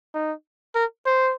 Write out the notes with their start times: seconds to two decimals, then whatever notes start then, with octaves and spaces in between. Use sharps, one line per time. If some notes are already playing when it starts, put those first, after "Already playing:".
0.14 D#4
0.75 A#4
1.06 C5